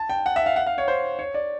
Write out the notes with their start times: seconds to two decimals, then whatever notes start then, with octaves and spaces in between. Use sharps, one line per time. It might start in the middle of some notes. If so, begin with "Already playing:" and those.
Already playing: A5
0.10 G5
0.26 F#5
0.36 E5
0.46 F5
0.56 F#5
0.67 F5
0.78 C#5
0.88 C5
1.19 C#5
1.34 D5